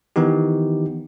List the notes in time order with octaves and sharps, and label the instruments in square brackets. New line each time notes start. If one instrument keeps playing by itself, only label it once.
[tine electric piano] D#3 E3 B3 D#4 G4